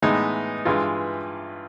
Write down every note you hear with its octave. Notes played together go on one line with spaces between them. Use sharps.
A2 E3 G#3 B3 D#4
G2 E3 G#3 F4